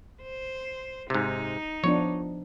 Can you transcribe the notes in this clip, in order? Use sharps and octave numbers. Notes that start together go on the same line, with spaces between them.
C5
G#2 C3 D#4
F3 B3 D4 C#5